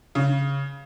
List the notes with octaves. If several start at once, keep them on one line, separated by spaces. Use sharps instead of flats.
C#3